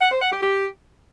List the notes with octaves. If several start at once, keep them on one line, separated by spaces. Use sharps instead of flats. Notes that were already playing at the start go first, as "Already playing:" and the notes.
F#5
C5
F#5
G4
G4